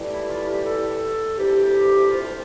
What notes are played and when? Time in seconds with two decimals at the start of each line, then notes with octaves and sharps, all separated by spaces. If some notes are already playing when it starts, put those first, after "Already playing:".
Already playing: A2 E3 G3
0.09 E4
0.27 F4
0.45 G4
0.64 A4
1.36 D2 C3 E3 G4
2.09 F4